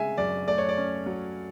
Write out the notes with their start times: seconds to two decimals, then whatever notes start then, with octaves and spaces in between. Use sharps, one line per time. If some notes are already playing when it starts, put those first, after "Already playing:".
Already playing: C#3 G#3 E5 G#5
0.18 F#2 D5
0.47 A3 D5
0.58 C#5
0.69 D5
0.77 C#4
1.06 F#3